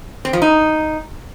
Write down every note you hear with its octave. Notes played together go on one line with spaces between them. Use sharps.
C4
F3
D#4